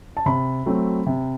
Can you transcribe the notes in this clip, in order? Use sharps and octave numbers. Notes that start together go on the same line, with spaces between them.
A5
C3 B5
F#3 A3 C4
C3